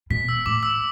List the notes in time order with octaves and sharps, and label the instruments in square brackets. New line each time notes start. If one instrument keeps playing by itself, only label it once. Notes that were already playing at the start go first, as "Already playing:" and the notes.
[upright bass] B2 [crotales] B6
[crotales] E6
[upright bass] A2 [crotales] D6
[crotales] E6